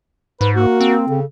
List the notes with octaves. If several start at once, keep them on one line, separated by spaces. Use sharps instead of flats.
G#2 B4
A#3 F#4
C4
C#3 A4